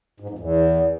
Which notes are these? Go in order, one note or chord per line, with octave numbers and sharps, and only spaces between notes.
G#2
F2
E2